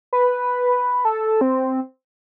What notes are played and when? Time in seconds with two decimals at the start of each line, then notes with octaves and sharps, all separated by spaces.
0.13 B4
1.05 A4
1.41 C4